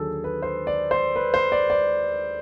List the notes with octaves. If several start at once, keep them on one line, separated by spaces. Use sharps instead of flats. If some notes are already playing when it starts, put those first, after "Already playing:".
Already playing: D#2 D3 F#3 G#4 A4
B4
C5
D5
C5
B4
C5
D5
D5